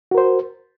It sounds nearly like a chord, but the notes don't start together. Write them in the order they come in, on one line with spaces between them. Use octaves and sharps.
F#4 A#4 C5